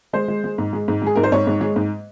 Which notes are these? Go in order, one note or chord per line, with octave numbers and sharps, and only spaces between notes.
G#3 C5
G#3
G#3
G#2
G#3
G#2
G#3 G#4
G#2 A#4
C5
G#2 C#5
G#2
G#3
G#2